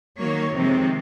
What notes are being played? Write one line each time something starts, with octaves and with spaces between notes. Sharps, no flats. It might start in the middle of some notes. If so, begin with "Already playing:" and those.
D#3 F#3 A#3 C#5
F2 C3 D#3 G#3 C4